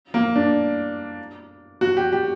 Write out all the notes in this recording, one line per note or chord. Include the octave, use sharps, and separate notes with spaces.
A#3
D4
F#4
G4
G4